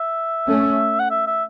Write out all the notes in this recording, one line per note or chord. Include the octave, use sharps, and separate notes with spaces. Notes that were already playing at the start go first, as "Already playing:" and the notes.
Already playing: E5
A3 C#4
F#5
E5
E5